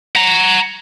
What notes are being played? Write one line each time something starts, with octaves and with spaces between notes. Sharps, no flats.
F#5 A#5